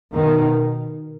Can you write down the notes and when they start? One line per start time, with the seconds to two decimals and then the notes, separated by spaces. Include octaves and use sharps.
0.13 B2 D#3